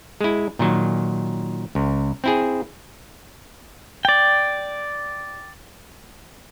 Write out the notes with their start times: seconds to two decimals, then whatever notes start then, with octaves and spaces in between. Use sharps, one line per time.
0.21 G#3 E4
0.59 A#2 D#3 F#3
1.75 C#2
2.24 C4 E4 G#4
4.05 D5 G5